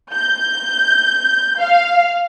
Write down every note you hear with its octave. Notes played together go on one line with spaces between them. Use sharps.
G6
F5